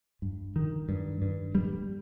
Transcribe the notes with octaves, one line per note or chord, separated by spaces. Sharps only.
G2
D#3
G2
G2
G3